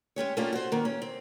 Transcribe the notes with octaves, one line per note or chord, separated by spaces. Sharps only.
G#3 C#4 G4 C#5
A3 A#3 C#4 D4 F4 G4
F#4 C5
D#3 A#3
C#4
C4